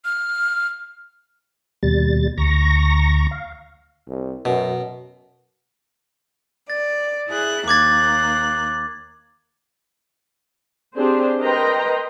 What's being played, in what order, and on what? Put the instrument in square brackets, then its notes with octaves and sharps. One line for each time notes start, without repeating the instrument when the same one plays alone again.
[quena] F6
[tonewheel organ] D#2 B2 G3 A6
D2 A#5 C#6 A#6
F5
[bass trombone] C2
[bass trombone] F#2 [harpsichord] B2
[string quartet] D5 [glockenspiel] A6
[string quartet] E4 G#4 F#6
[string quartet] D#2 A#3 F#6 [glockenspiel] D6 G#6 A6
[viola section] C4 D4 G4 G#4 C5
A#4 B4 D#5 G5 A#5 C6